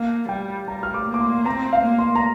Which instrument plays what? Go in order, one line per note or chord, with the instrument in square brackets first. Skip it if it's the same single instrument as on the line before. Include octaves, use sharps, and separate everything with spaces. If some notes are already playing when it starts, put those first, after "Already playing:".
Already playing: [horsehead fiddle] A#3 [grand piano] F5
[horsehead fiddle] G3 [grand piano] G5
[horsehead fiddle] G3 [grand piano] A#5
[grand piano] F6
D6
[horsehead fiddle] A#3
[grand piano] D6
C6
[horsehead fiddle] C4 [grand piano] A#5
[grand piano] F5
[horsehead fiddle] A#3
[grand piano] C6
A#5